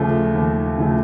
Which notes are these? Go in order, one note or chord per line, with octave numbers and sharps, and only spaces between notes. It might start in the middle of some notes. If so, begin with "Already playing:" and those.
Already playing: D#2 C#3 F3 A3
D#2
C#3 F3 A3